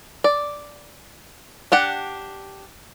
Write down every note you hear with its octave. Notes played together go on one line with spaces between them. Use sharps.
D5
D4 G4 F#5